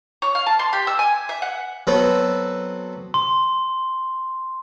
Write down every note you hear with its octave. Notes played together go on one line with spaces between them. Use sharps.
C#5
F5
A5
C6
G4
E6
G#5
E5
F#5
F#3 B3 C4 A4 B4
C6